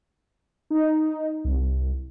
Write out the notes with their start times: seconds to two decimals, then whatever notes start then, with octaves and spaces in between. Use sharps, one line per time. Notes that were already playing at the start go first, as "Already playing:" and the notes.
0.70 D#4
1.44 C2